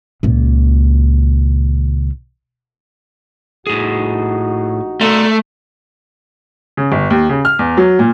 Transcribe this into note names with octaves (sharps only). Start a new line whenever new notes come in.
C#2 A#2
A#1 A2 D#4 F#4 G#4
A3 D5 A#5 C6
C#3
G1
D#2
C#3
F6
E2
F#3
A#2